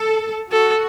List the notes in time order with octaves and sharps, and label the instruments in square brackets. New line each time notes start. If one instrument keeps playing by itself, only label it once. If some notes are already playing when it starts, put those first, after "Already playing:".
Already playing: [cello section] A4
[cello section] F#4 [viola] A4